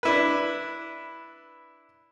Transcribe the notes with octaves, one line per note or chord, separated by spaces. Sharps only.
D4 E4 B4